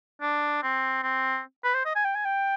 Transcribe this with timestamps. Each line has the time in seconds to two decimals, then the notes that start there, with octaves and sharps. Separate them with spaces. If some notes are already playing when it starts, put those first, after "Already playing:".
0.22 D4
0.63 C4
1.03 C4
1.64 B4
1.74 C5
1.85 D#5
1.96 G#5
2.05 G5
2.15 G#5
2.25 G5